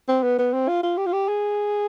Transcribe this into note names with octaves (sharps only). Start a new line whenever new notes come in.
C4
B3
B3
C4
F4
F4
G4
F4
G4
G#4